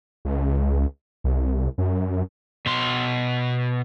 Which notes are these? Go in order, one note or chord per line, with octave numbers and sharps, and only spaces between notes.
C#2
C2
F#2
B2 C6